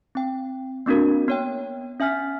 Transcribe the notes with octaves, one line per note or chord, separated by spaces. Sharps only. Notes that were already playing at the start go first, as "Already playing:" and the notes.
C4 G5
A#3 C4 D4 F#4 A#4
B3 C#5 G5
C#4 E5 G#5 F6 B6